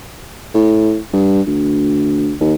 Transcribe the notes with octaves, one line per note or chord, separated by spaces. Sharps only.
A2
G2
D2
D#2